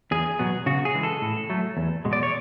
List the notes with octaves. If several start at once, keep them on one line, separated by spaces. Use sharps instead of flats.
E2 G#4
B2 F#3 B3
C#3 F#4
G#4
E3 G#3
A4
A2
F#3 A3
E2
B2 G#3
D5
C#5